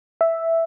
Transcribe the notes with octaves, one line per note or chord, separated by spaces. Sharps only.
E5